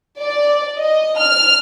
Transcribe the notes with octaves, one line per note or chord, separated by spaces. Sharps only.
D5
D#5
F6